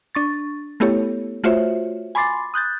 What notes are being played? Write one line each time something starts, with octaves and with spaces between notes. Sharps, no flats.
D4 C#6 A6
A3 B3 E4 G4 A4 C#5
A3 F4 F#4 C5 C#5 E5
G#5 B5 C6 D6 A6 C7
D#6 F#6 G6 A6